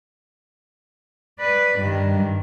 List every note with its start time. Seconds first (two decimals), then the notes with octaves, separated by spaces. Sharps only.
1.39 B4 D5
1.79 G2 D#3